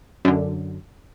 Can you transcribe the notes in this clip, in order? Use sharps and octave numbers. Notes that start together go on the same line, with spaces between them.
F#2 D3